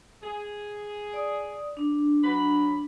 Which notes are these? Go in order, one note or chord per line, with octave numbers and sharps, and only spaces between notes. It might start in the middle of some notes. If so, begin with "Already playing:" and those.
G#4
D5 D#6
D4
F#3 B5